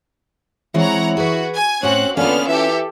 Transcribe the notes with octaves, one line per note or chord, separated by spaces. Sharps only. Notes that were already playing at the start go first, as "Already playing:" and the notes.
E3 G#3 C4 E4 C#5 F#5 A#5
F#4 G#4 B4
G#5
A2 C4 C#4 F#4 F#5 G#5 F#6
D3 A#3 B3 C#4 F4 F6
E3 G4 A4 E5